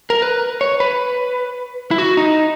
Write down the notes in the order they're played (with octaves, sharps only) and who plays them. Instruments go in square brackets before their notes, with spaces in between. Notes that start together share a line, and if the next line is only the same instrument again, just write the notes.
[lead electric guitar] A#4
B4
C#5
B4
E4
F#4
D#4